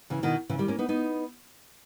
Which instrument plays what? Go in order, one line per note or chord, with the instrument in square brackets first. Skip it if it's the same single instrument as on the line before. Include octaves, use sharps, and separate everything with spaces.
[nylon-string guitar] C#3 E3
B2 D#3
C#3 E3
D#3 G3
A#3 C#4
B3 D#4
B3 D#4